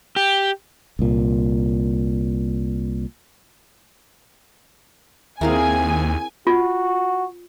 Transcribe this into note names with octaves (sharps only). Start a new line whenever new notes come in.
G4
C2 A#2
D#2 C4 E4 G#4 A#4 F5 G#5
F4 F#4